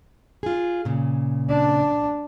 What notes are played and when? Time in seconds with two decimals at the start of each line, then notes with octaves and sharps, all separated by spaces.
0.43 F4 G#4
0.85 A#2 C#3
1.49 D4